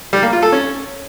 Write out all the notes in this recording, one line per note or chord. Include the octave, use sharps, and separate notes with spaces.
G3
A#3
F4
A4
C#4